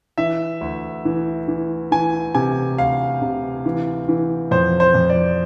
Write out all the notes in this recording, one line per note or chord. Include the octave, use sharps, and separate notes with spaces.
E3 E5
D2
E3
E3
E3 G#5
C3 G#5
D2 F5
C3
E3
E3
F2 C5
C5
F2
D5